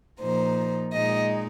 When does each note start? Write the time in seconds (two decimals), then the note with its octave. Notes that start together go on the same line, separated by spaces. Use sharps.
0.20 A#2 F3 A#3 D#4 C5
0.94 A#2 G#3 D#4 D#5